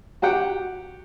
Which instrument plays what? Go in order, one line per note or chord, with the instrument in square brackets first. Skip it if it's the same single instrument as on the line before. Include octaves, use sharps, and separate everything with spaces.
[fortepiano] F#4 G4 F#5 G5